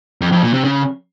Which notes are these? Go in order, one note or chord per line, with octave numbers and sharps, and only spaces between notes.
F2
F2
A#2
C3
C#3